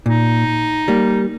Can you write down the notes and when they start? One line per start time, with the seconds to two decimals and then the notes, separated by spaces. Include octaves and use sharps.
0.06 A#2 D#4
0.88 G3 A#3